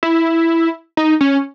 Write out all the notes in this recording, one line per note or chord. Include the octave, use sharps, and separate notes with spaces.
E4
D#4
C#4